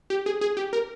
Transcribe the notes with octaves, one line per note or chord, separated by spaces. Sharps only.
G4
G#4
G#4
G4
A#4